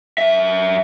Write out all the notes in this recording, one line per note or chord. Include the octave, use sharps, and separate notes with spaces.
F#2 E5